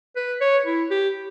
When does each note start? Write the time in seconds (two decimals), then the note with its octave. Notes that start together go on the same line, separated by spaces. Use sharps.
0.16 B4
0.41 C#5
0.66 E4
0.91 G4